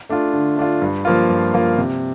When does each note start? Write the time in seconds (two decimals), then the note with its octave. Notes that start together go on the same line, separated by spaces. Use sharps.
0.09 A3 D4 F4
0.33 D3
0.57 A3 D4 F4
0.82 G2
1.05 F3 A#3 F4
1.30 G2
1.54 F3 A#3 F4
1.78 C3